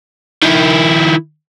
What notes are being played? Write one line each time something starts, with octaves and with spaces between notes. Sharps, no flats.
D#3 E4